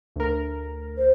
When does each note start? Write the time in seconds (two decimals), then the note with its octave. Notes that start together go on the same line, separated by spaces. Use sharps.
0.16 D2 A#4
0.97 C5